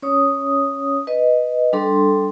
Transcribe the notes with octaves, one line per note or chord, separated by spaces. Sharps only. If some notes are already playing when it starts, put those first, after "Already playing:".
C#4 C#5 D#6
B4 D#5
G3 D4 A4 C6